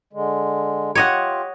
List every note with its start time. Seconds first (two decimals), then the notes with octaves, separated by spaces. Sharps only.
0.13 D3 G#3
0.95 F4 G4 C#5 D#5 F#5